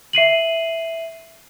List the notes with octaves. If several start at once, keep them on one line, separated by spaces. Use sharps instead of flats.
E5 C7 D#7 F#7